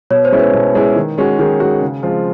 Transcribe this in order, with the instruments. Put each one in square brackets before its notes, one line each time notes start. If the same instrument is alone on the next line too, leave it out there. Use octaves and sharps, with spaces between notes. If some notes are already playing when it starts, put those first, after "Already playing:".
[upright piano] B2 [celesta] C#5
[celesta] C5
[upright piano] G#3 C#4 E4
[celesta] B4
[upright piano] B2
G#3 C#4 E4
D#3
G#3 C#4 F#4
[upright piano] D#3 [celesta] G#4
[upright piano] G#3 C#4 F#4
C#3
F3 G#3 C4 F4